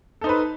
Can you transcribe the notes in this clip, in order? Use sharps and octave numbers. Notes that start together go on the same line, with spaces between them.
D#4 A4 B4 C5